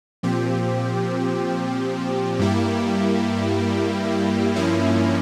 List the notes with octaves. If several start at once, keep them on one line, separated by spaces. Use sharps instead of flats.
A#2 F3 C4 G4
G2 G3 A#3 E4 G4
G2 F3 A#3 C#4 E4